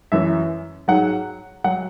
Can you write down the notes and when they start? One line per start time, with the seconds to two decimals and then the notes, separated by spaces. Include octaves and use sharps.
0.12 F#2 E3 E5
0.88 G#2 F#3 F#5
1.64 F#3 F#5